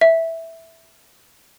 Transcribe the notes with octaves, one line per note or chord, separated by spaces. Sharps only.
E5